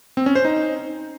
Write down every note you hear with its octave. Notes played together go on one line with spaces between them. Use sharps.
C4
C#4
C5
D#4